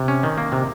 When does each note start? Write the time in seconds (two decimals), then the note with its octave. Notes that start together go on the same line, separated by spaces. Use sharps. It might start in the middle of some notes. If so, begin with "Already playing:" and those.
Already playing: C3
0.08 C#4
0.23 D#3
0.38 A#3
0.52 C3